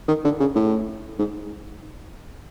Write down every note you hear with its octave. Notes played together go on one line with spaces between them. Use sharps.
D#3
D3
C#3
A2
G#2